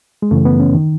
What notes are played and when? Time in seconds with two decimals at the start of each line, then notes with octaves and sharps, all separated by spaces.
0.22 G#3
0.31 F#2 C#3 E3 A3
0.45 B3
0.60 C#4
0.75 D#3